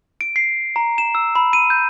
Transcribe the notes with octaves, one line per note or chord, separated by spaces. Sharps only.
D7
C7
A#5
E7
E6
B5
D#7
G6